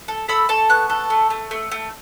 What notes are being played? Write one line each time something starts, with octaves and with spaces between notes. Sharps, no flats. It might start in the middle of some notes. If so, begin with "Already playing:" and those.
A4
A4 B5 E6
A4 A5 C#6
B3 C#6 F#6
A4
A3
A3
A3
A3